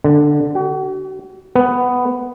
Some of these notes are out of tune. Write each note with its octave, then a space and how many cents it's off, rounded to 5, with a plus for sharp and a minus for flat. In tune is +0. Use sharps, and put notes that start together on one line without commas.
D3 +5
F#4 +40
B3 +10